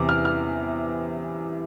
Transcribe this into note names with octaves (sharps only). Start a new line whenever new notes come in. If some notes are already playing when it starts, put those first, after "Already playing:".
Already playing: E2 C3 E3 D6
F6
F6